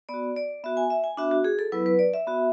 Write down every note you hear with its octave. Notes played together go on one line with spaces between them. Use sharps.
B3 F#4 D5
D5
B3 F#4 E5
G#5
E5
G#5
B3 D4 F#4 E5
F#4
G#4
A4
F#3 B3 E4 B4
B4
D5
E5
B3 F#4